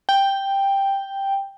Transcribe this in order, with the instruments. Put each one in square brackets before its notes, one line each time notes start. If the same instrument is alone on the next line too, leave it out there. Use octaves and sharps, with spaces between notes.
[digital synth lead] G5